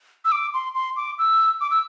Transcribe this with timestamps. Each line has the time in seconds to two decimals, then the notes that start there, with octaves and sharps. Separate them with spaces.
0.25 E6
0.32 D6
0.54 C6
0.75 C6
0.96 D6
1.19 E6
1.61 D6
1.71 E6